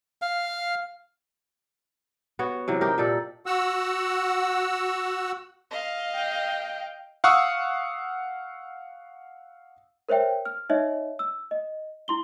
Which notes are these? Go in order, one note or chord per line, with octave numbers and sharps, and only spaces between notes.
F5
B3 F#4 C#5
C3 E3 F#3
D#4 G4 A#4
A#2 D#4 A4 D5
F#4 F#5 E6
D#5 F5
G5
F5 F#5 C#6 D#6 E6
A#4 C5 C#5 E5 G5
F6
D#4 C#5 D#5 E5
E6
D#5
E4 C6 G7